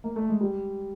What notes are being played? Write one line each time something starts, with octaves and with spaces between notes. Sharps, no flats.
A#3
A3
G#3
G3